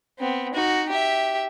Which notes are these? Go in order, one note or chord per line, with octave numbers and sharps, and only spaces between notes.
B3 C4
D#4 F#4
G4 E5